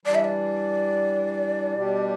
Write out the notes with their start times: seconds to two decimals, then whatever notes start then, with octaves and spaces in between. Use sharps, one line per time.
0.05 E3 G3 D4 D5
0.15 E5
0.24 D5
1.75 B2 G3 D4 G4